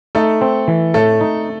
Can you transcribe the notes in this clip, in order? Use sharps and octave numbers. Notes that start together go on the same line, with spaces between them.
A3 D#4 A4
C4
E3
A2 A3 A4
D#4